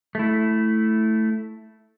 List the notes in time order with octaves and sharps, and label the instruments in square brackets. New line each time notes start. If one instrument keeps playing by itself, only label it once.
[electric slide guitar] A3 E4